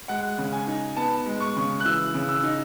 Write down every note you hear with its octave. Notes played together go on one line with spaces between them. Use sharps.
G#3 F#5
C#3
G#5
D#4
B3 A5
G#3
C#6
C#3
F#6
E3 E6
C#3
E6
D#4